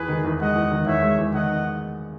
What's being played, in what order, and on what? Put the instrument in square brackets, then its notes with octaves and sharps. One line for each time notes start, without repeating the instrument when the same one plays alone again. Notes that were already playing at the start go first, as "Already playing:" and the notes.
Already playing: [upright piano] E2 [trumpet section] G#4 B4
[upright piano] D#3
E2
[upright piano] G#3 [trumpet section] D#5 F#5
[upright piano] E2
D#3
[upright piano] E2 [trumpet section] C#5 E5
[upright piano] G#3
E2
[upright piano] D#3 [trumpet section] D#5 F#5